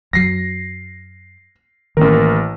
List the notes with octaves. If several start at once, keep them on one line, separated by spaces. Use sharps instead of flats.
F#2 F#3 A#6 C7
A1 D#3 A#3 C#4 A#4